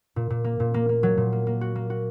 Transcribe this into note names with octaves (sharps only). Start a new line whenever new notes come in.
A#2
A#2
A#3
A#2
A#3
A#3
F#3
A#2
A#3
A#3
F#4
A#3
F#4